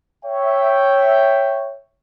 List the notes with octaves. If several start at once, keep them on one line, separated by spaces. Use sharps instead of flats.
C#5 E5 G5